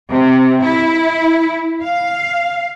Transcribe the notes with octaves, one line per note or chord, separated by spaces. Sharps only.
C3
E4
F5